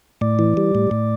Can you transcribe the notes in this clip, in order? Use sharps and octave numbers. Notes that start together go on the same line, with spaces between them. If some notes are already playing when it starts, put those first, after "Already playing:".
A2 D5
E3
G3
A2
A2